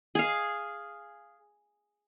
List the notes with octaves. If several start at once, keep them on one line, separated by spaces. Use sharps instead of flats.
G#4 F5